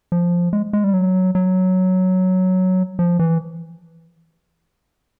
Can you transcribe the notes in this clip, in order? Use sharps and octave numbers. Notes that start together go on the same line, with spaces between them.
F3
G#3
G#3
G3
F#3
F#3
F3
E3